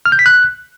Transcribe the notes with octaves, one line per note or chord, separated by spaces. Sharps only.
F6
G6
B6
F#6